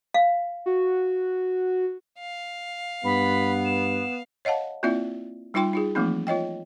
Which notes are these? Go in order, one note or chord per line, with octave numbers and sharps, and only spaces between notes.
F5
F#4
F5
G2 B3 B5
E7
C#5 D#5 F5 F#5 A5
A#3 C4 E4 F4 D5 E5
G3 D#4 F4 G5 C6
D#4 F4 G#4
E3 F3 A3 A#3 C4 D#4
F4 C#5 D#5 G5